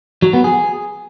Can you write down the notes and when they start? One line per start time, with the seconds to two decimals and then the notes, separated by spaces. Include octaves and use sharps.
0.22 F#3
0.33 B3
0.44 G#4